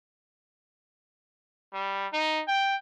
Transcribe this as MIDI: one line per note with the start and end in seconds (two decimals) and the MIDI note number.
1.73 2.07 55
2.13 2.43 63
2.47 2.76 79